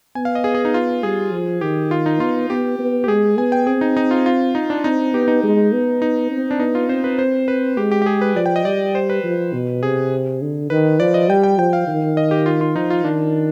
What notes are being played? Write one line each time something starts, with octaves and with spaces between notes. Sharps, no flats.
B3 G#5
F5
D#5
G#4
G#4
D#4
F4
G3 G#4
F3
D#3 G4
F4
D#4
B3 F4
B3 G4
B3
G4
G#3 G#4
B3 G#5
G5
C4 G#4
D#4
D#4
F4
F4
D#4
D4
C4 D#4
B3 G4
D#4
G#3
B3
D#4
C4
D4
B3 D#4
F4
C4 C5
B4
C5
B4
G#3 G4
G4
G4
G#4
B4
F3 D5
G5
D#5
G3 D5
C5
B4
F3
B2
C3 G#4
D3
D#3 B4
F3 D5
D#5
G3 G5
G5
F3 G5
F5
D#3
D#5
G4
F4
F4
F3 D#4
F4
D#3 D4